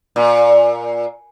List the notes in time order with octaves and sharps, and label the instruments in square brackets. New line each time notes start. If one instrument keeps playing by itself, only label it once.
[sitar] A#2